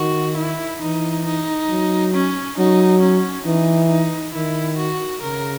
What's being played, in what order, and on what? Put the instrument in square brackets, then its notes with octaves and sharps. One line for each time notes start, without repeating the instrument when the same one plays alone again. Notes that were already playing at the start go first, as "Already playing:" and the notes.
Already playing: [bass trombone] D#3 [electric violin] F#4
[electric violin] E4
[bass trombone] E3 [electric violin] D#4
[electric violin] D#4
[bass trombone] F#3
[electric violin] C#4
[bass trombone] F#3 [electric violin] D#4
[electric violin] C#4
[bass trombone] E3 [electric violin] D#4
[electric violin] D#4
[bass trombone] D#3 [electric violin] E4
[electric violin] F#4
[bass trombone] C#3 [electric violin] A#4